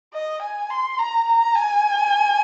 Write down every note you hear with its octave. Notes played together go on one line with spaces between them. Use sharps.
D#5
G#5
C6
A#5
A#5
G#5